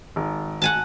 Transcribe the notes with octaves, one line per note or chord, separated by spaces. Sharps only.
G#1
F#5 G#5 A5